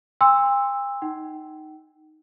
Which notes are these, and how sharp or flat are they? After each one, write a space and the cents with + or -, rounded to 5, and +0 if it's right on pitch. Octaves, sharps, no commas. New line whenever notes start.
G5 +45 C6 +0 E6 +0
D#4 +0 G5 -40